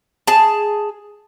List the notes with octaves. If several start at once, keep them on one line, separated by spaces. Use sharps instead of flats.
G#4 A5